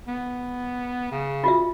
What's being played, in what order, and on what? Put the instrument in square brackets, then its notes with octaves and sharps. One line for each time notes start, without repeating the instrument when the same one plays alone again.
[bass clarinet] B3
C#3
[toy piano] F4 F#4 E5